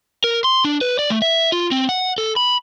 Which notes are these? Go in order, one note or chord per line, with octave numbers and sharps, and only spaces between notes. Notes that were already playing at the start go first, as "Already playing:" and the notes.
A#4
C6
D4
B4
D5
A3
E5
F4
C4
F#5
A4
B5